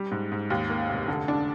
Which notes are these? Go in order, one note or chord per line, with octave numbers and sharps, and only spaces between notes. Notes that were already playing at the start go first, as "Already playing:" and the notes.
Already playing: G3
G#2
G#2
D#2
A#3
F1
D3
D4